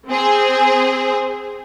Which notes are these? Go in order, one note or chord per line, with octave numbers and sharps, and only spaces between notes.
C4 G#4 C5